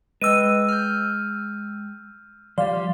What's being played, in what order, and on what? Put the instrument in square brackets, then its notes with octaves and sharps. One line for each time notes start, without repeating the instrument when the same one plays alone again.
[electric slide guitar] G#3 G5 [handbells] B4 D#5 [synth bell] E6 D#7
[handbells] F6 G6
[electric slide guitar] F3 G3 [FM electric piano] D5 F5 [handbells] C6